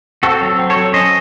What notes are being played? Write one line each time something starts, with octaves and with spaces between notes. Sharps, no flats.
C4 F#4 A4
F#3
C4
A4 C#5
F#3
C#4 C5 D#5